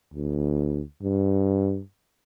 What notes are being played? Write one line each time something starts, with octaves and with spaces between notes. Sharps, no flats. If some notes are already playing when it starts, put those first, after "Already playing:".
D2
G2